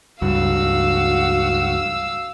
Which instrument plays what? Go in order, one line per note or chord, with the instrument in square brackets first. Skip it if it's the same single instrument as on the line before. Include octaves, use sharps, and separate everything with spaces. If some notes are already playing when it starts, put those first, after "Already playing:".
[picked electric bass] C#2 G2 [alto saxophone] F#4 [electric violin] F5 E6